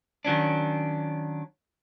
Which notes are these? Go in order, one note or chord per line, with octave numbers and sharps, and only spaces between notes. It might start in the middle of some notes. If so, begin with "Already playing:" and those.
D#3 F#3 C#4 D4